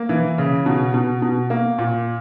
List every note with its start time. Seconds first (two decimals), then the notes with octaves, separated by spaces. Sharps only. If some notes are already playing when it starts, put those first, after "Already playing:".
Already playing: A#3
0.09 E3
0.38 C#3
0.66 B2
0.94 B2
1.22 B2
1.50 A#3
1.78 A#2